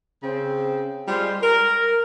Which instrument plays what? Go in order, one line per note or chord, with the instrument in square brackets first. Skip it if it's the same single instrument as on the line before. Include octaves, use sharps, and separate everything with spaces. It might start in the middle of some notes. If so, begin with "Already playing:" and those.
[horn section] C#3 C4
G3 G#3 F4 C5
A#4